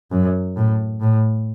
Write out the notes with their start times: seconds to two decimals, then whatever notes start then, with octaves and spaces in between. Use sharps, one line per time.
0.12 F#2
0.56 A2
1.01 A2